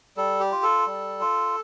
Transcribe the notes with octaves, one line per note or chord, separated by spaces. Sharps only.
G3 A4
G4
F4
A4
G3
F4